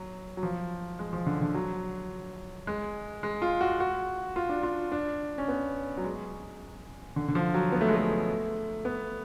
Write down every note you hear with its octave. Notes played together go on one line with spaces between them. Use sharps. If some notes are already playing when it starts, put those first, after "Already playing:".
Already playing: F#3
F#3
F3
G#3
F3
D3
D3
F#3
G#3
G#3
F4
F#4
F#4
F4
D4
F4
D4
C#4
B3
F#3
G#3
D3
D3
F3
F#3
B3
A3
G#3
A3
B3